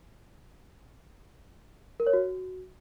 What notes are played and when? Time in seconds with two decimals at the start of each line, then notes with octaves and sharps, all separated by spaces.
2.00 A#4
2.07 C#5
2.13 F#4